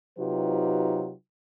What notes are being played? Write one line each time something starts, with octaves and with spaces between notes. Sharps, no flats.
C3 F#3 D#4 F4 G4 B4